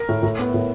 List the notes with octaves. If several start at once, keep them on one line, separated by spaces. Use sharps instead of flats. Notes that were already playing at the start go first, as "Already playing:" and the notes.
Already playing: A#4
A2
A2
B3
A2